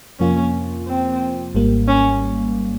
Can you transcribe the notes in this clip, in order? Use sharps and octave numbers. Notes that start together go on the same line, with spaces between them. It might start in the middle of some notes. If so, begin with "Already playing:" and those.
F2 C3 F3 A#3 C#4 F4
C4
G#1 G#2 G3 A#3
C#4